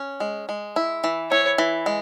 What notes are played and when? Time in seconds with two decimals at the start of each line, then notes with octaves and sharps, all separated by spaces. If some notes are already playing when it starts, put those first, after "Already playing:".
Already playing: C#4
0.20 G#3
0.49 G#3
0.76 E4
1.04 E3
1.31 E4 C#5
1.58 E3
1.86 G#3